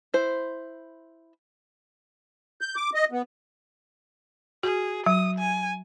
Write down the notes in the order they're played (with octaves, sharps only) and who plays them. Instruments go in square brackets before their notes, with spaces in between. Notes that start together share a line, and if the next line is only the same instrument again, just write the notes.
[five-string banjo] E4 C5
[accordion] G6
D6
D#5
B3
[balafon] F#4 [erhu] G#4
[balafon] F#3 [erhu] D#6
[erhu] G#5